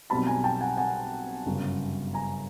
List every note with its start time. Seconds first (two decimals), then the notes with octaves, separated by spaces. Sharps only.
0.10 B1 B2 G3 C4 A5 B5
0.27 G#5 A#5
0.44 G5 A5
0.61 F#5 G#5
0.78 F#5 G#5
1.46 G1 F#2 C#3
2.14 G#5 A#5